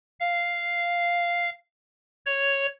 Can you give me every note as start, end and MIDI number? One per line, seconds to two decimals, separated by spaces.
0.20 1.50 77
2.26 2.66 73